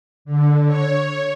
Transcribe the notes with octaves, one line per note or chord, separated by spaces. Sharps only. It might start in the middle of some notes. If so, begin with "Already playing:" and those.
D3
C#5